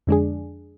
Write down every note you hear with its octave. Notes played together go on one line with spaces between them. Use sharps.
F2 D3 G#3 D4 G#4